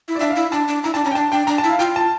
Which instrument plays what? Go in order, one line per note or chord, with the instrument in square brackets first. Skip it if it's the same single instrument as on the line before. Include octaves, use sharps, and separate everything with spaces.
[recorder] E4
[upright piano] D5
[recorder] D4 [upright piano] E5
[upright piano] F5
[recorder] E4
[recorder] D4 [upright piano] A5
[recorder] D4
[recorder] E4 [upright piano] A#5
[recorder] D4 [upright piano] A5
[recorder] C#4 [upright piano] A#5
[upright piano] G5
[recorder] D4 [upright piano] A5
[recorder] D4 [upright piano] G5
[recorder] D4 [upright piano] A#5
[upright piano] A5
[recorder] E4
[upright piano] F5
[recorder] F4 [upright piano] G5
[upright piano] A5